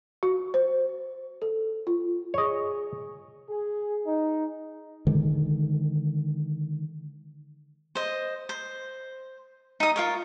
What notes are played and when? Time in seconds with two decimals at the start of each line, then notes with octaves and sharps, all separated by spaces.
0.23 F#4
0.54 C5
1.42 A4
1.87 F4
2.34 G#4 C#5 D#5
3.49 G#4
4.05 D#4
5.07 D3 D#3 G#3
7.95 C5 D#5
8.49 C5
9.80 D#4 D#6
9.96 F4 A#4 C#5